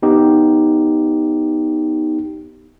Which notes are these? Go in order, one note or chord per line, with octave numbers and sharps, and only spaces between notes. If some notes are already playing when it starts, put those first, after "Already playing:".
B3 D#4 G4